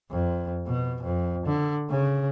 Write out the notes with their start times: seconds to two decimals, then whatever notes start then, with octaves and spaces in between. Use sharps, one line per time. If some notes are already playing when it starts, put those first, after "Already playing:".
0.11 F2
0.67 B2
1.04 F2
1.46 D3
1.89 C#3